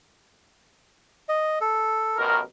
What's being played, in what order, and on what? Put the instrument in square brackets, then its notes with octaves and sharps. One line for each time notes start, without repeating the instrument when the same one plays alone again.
[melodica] D#5
A4
[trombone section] A1 B2 A#4